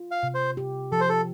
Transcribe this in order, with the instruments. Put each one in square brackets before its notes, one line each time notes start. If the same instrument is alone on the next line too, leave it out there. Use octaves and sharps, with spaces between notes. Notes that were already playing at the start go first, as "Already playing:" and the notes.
Already playing: [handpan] F4
[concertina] F5
[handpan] C3
[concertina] C5
[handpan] G4
[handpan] F3 [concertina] A4
[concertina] C5
A4